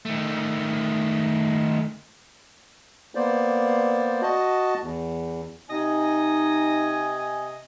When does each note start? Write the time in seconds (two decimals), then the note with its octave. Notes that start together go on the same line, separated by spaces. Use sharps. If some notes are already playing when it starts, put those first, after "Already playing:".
0.05 D#3 A3
3.15 A#3 B3 C5 D5
4.22 F#4 D#5 A5
4.82 E2
5.69 C3 D#4 D#5 G#5